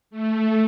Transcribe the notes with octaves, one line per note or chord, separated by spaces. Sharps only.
A3